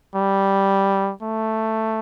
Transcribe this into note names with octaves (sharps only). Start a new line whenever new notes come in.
G3
A3